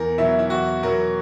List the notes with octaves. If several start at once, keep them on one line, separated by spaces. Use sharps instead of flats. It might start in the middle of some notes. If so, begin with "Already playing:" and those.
Already playing: E2 A#4
B2 F#3 E4
E4
E2 F#4
B2 F#3 A#4